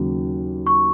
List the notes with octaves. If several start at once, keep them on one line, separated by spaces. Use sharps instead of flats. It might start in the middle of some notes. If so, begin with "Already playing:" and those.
Already playing: D#2 C#3 F#3
C#6